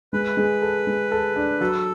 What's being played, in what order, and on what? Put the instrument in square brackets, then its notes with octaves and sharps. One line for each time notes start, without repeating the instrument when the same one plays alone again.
[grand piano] G#3 [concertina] B4
[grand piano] G#3
A4
G#3
A4
D4
[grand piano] F#3 [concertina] A4